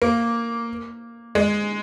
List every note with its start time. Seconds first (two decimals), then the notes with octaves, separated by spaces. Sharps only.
0.02 A#3
1.35 G#3